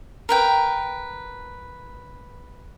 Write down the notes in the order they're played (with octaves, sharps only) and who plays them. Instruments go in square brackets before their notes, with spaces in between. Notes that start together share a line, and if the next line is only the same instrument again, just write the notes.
[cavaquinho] A#4 B4 G5